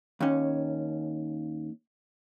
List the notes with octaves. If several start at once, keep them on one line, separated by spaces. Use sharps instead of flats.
D#2 C#4